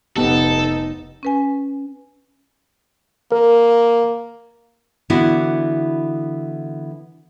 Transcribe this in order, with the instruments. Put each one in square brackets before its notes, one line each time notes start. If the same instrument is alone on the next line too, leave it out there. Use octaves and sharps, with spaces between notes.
[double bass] F1 D#4 [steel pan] B3 G4 [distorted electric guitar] A4 [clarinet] A5
[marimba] C#4 B4 G#5
[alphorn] A#3 [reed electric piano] A#4
[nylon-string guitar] D3 E3 B3 D4 E4 F#4